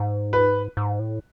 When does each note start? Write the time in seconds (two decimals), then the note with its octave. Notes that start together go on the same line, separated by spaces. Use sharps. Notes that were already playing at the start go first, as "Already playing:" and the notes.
Already playing: G#2
0.33 B4
0.77 G#2
0.99 A2